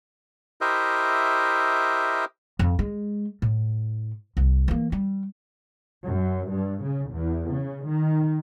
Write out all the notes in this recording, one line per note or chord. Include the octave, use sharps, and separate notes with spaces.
E4 G4 A#4 C5 D#5 E5
F2
G#3
A2
C2
E3 A#3
G3
F#2
G2
C#3
E2
C#3
D#3